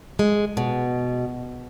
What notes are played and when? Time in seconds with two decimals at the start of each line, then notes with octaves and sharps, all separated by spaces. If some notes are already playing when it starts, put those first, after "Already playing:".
0.19 G#3
0.57 B2